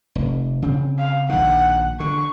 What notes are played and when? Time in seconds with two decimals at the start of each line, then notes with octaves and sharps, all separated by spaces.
0.15 F1
0.62 C#3 C4
0.99 F5
1.29 A#1 D#3 F#5
2.00 D3 C#6